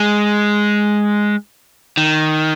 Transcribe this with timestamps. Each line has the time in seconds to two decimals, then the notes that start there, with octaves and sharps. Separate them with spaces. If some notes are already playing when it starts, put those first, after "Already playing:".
Already playing: G#3
1.97 D#3